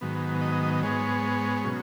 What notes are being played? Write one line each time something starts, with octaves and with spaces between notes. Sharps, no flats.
G#2 D#3 F#3 B3
D#5
D#5
D#5
D#5
G#2 G#3 B3 C#5
B2 F#3 C#4